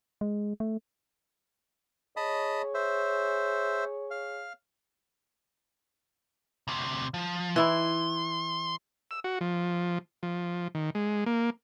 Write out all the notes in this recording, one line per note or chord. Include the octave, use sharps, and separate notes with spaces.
G#3
A3
G#4 C#5 D#5 A5 B5
C5 E5
F5
D2 C3
F3
E3 E4 C6
E6
F#4
F3
F3
D#3
G#3
A#3